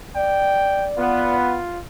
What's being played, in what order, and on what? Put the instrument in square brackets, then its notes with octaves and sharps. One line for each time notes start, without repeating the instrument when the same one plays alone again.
[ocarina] D5 [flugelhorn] G5
[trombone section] B3 [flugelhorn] F4